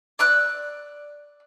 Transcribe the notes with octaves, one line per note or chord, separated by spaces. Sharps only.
D5 E6 F#6